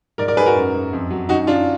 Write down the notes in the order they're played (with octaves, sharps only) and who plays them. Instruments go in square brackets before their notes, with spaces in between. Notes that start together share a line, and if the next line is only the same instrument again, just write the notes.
[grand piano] G#2 A#4 D5
A#4 D5
G#2 G#4 B4
F#4 A#4
F#2
F#2
F2
F#3
F#2 D#4 F#4
F#2 D4 F4